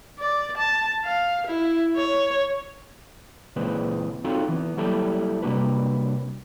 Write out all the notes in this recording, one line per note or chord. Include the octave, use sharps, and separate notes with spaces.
D5
A5
F5
E4
C#5
C#2 A#2 E3 G#3 C4 B4
C4 D#4 F4 F#4 A4
E3 B3
F#3 G3 A#3 E4 G4 A4
C3 G3 A#3 D4 F#4 B4